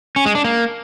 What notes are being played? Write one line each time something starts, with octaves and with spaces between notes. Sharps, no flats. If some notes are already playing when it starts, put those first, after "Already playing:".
C#4
G#3
D4
A#3